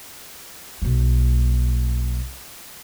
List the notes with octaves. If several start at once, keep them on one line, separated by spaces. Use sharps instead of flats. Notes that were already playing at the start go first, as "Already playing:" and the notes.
B1 A#3